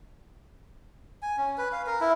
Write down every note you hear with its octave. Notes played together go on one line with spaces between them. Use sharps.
G#5
C#4
B4
F5
A#4
E4